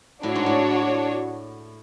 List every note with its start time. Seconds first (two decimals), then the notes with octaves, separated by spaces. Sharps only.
0.23 A2 D4 F#4 C#5
0.35 G#2
0.46 A2